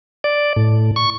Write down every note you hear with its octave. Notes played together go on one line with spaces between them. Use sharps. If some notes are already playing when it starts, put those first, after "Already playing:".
D5
A2
C#6